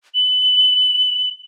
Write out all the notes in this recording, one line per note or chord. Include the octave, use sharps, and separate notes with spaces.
F#7